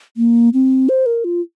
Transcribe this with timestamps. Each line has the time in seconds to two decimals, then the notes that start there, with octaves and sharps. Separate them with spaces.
0.17 A#3
0.53 C4
0.89 C5
1.06 A#4
1.24 F4